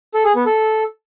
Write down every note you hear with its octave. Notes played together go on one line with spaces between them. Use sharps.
A4
G#4
B3
A4